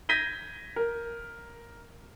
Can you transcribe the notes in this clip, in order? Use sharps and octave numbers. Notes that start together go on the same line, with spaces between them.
G6 G#6 A#6 B6 D#7 G7
A#4